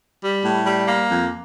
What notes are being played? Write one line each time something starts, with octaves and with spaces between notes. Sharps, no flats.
G3
A2
G3
A#3
F2